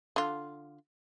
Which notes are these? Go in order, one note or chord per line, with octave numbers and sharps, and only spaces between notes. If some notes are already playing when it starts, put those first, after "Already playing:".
D3 F4